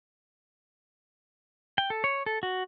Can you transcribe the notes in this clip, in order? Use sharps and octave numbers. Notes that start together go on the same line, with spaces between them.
G5
A4
C#5
A4
F#4